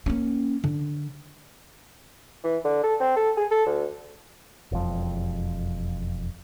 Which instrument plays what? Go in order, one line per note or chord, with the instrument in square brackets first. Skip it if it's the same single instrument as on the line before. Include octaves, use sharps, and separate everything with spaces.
[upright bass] A#3 C#4
D3
[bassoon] E3
D3
A4
C4
A4
G#4
A4
D2
[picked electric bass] E1 F2